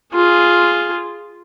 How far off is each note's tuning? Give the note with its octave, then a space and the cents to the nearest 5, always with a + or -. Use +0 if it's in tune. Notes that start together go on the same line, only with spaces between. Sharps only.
F4 +0 G#4 +0